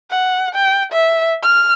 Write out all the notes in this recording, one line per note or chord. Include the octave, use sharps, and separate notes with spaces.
F#5
G5
E5
F6